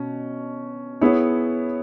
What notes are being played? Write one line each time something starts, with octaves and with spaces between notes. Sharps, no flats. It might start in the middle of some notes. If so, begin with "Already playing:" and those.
Already playing: B2 C#4
B3 E4 G#4 C#5